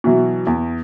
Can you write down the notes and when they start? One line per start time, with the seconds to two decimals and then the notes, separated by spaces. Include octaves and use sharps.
0.04 B2 E3 F#3
0.47 E2